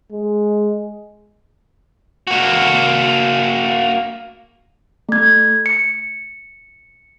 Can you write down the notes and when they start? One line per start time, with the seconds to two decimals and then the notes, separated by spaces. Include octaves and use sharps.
0.12 G#3
2.27 A#3 F#4
5.09 A3 G#6
5.66 C#7